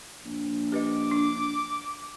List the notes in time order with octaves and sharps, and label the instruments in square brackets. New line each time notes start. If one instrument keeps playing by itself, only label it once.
[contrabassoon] A#1
[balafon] G4 B4 D#5 [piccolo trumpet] D6
[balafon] D4